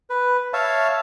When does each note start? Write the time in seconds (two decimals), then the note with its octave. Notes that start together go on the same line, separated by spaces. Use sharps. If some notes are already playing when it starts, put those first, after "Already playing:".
0.10 B4
0.53 C#5 E5 F5 A5